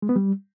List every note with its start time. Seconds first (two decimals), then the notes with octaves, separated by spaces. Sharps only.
0.02 G#3
0.09 B3
0.16 G3